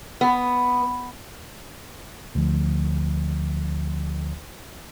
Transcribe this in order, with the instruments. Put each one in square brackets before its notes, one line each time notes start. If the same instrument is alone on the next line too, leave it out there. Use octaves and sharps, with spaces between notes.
[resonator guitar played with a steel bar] B3
[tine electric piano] D2 D3 F3